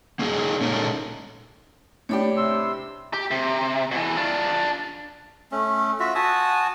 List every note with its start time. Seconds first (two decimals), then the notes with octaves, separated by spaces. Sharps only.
0.19 A#3 C#4 D#4 G#4
0.61 A#2 G#3 C#4 D#4 A4 A#4
2.09 A2 D4 G4 C#5 B5
2.37 C3 C6 E6
3.13 G4
3.31 C3
3.91 B2 E3
4.17 D4 F4
5.52 A3 C#4
6.00 F4 F#4 E5
6.15 F#4 G#5 A5 D#6